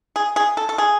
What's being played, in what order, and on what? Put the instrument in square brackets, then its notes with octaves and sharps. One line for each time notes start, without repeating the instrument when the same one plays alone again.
[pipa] G#4
G#4
A4
A4
G#4